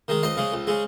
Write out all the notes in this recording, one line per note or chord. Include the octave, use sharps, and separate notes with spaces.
D#3 G#3
C#2 C5 D#5
C#3 G#3
C#2
C#3 G#3